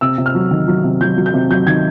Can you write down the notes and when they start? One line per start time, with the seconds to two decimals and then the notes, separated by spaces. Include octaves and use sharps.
0.01 C3 E6
0.18 C3
0.26 F6
0.35 F#3
0.51 D#3
0.68 F#3
0.84 C3
1.01 F#3 G6
1.17 F#3
1.26 G6
1.34 C3
1.50 F#3 G6
1.66 D#3 G#6